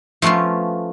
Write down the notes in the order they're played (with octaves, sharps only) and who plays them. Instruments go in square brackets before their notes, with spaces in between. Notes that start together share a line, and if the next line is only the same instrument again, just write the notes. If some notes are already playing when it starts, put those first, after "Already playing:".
[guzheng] F3 A3 B3 C#4 F4